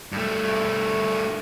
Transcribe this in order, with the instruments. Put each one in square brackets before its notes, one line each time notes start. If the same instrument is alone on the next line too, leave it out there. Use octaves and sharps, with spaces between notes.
[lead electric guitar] G2 A3